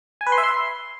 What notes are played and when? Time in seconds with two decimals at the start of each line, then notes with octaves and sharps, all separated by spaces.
0.21 G#5
0.27 B4
0.32 C6
0.38 E5
0.44 C6